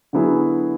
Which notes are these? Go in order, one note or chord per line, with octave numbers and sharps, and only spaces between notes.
D3 F#3 B3 E4 G#4